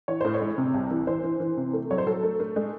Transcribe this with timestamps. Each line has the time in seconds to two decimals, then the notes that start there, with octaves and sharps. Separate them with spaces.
0.08 E3 C#5
0.21 A2 C5
0.34 C#5
0.41 G#3
0.58 C3
0.74 C2
0.91 E3
1.07 E3 C5
1.24 E3
1.40 E3
1.57 C3
1.73 A3
1.90 F#3 C#5
1.98 C5
2.07 F#3 A4
2.23 A3
2.40 A3
2.56 G#3